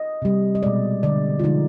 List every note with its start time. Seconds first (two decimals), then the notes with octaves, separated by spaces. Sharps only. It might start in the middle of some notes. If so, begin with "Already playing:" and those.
Already playing: D#5
0.22 C3 G3
0.55 D#5
0.63 B2 G#3 D5
1.03 D3 G3 D5
1.39 F4
1.44 D3 F3 G#3 D#4